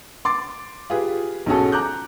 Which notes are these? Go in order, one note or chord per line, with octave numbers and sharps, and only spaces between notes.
C6 D6 A6
F4 G4 G#4 B4
B1 G#2 C#4 F#4 G#4 A4
A#5 D6 F#6 G6